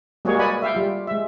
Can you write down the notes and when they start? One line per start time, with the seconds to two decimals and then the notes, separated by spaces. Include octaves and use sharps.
0.25 G3 G#3 A#3 F#4 G#4 C#5
0.39 B4 D5 D#5 F#5 G#5 B5
0.62 E5 F5 G5
0.75 G3 F4
1.07 G#3 E5